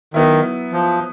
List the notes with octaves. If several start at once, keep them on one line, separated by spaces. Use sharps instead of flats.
D#3 F#3 B3 E4
F3